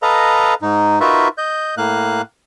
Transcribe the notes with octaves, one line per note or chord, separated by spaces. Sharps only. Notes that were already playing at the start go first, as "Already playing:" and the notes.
A4 B4 D#5 F5 A#5
G#2 D#4
D#4 F4 F#4 A#4 B4 E5
D#5 G6
A2 A#3 F5 F#6